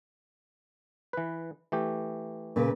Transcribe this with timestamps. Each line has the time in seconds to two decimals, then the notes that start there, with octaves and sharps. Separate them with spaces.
1.13 E3 B4
1.72 E3 A3 G4
2.56 A#2 C#3 B4